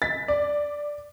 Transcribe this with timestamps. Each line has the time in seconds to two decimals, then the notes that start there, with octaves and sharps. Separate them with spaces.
0.02 A6 B6
0.28 D5